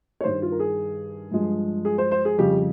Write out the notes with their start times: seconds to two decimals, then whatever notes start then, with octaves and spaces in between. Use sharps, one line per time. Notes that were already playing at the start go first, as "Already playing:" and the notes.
0.21 C#5
0.24 G2 D#3 G3 C5
0.42 F4
0.52 A#4
0.60 G#4
1.31 G2 F3 G#3
1.85 G#4
1.98 C5
2.11 C5
2.25 G#4
2.38 F2 C#3 G3 G4